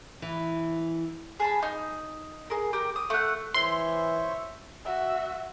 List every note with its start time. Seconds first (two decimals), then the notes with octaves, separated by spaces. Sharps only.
0.22 E3
1.40 G#4 A5 B5
1.63 D#4
2.50 G#4 A#4
2.73 G4 A#4
2.96 D#6
3.10 A3 F#5
3.54 E3 C5 C#5 E5 C6 C#6
4.84 F#4 E5